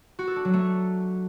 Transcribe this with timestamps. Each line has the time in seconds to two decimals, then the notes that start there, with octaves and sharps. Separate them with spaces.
0.19 F#4
0.27 A4
0.36 D4
0.45 F#3
0.54 A3